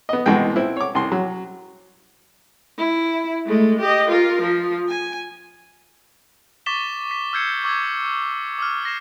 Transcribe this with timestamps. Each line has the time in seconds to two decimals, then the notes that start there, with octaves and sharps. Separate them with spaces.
0.09 B3 D#5
0.26 C2 B2 E3 G#3 G5
0.56 C4 E4
0.77 C#5 D6
0.95 C2 C6
1.12 F#3
2.78 E4
3.46 G#3 A3
3.81 G4 D#5
4.09 F4 A#4
4.42 F3
4.89 G#5
6.66 C#6 D6 A6 B6 E7 G7
7.11 B6
7.33 E6 F6 G6 G#6 C7 C#7
7.64 C#6 D6 E6 G6 G#6
8.58 D6 E6 F6
8.84 D6 A#6 C7 E7